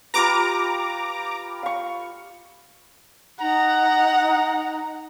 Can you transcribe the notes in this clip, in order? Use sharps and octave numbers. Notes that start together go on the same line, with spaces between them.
F4 G4 B4 A#5 D6
F5 C#6
D#4 F#5 A#5